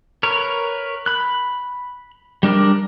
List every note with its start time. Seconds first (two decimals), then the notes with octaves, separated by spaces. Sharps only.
0.23 A#4 B4 C#5
1.06 B5 F#6
2.43 G3 D4 A#4 D5